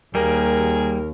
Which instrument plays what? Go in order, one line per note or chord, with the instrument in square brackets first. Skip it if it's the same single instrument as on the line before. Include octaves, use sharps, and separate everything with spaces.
[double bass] D#2 [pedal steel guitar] G3 A#3 [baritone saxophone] G#4 [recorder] A#4